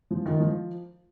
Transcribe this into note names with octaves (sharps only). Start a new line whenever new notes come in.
F3
D#3
F3